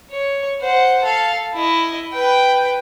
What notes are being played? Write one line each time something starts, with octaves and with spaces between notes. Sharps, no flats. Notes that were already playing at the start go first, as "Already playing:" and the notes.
C#5
C5 F#5
A4 F5
E4 D#5
B4 G5